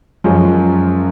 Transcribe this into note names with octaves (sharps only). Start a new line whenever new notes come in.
F#2 F3 G#3 C#4